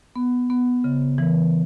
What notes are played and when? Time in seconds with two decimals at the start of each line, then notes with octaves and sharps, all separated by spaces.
0.16 B3
0.50 B3
0.84 C#3
1.18 E3